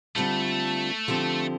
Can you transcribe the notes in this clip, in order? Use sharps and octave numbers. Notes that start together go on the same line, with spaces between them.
D3 G3 A3 C4 F4 A4
D3 F3 C4 G4